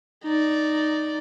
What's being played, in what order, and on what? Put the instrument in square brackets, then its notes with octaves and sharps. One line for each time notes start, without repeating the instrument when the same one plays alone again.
[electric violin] D#4 D5